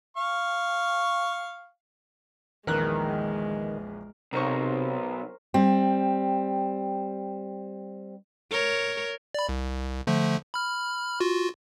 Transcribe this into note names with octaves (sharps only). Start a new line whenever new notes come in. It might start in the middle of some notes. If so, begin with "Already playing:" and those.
F5 C#6
A#1 E2 D#3 G#3 A#4 B4 F#6
B1 C3 A#4 C5 C#6
G3 C4
A#4 C#5
D5 B5
C2
D3 F3 A3
B5 F6
F4 F#4